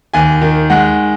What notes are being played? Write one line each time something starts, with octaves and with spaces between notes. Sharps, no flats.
D#2 G#5
D#3
G#3 F#5